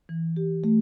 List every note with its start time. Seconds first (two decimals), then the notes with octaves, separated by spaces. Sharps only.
0.09 E3
0.37 G4
0.64 A3